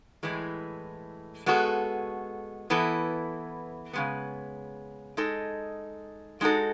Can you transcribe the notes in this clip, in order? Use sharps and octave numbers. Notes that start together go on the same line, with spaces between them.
A2 E3 G#3
G#3 B3 F#4 A4
E3 B3 E4 A4
C#3 G#3 B3
G#3 D#4 A4
G#3 D#4 F#4 A4